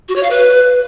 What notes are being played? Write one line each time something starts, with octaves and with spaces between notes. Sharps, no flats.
F#4
C#5
F5
B4